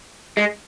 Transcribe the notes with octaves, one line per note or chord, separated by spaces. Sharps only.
G#3